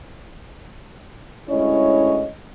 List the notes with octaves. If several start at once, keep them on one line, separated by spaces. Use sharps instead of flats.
D2 G#3 C#4 E4 C#5 D#5